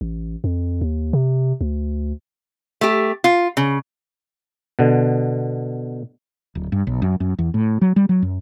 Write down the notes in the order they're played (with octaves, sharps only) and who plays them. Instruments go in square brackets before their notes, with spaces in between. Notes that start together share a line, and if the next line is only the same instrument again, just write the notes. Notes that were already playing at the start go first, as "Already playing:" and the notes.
[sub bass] A1
F2
D#2
C3
D2
[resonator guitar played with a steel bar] A3 G4
F4
C#3
[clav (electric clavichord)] B2 D3
[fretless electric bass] D1
G2
B1
F#2
F#2
E2
A2
F#3
G3
F#3
F#2